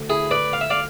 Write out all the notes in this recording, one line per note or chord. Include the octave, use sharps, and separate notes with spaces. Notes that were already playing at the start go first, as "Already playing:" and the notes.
Already playing: D2
E4 G#4
B4 D5
F5
E5
D5 F5